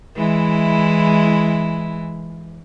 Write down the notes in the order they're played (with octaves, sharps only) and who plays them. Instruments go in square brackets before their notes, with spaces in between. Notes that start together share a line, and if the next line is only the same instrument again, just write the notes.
[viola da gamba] E3 G#3 E4